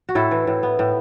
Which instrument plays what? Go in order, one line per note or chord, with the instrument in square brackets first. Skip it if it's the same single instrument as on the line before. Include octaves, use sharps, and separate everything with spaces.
[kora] F#4
A2 E4 A4
E3
A2
B3
A2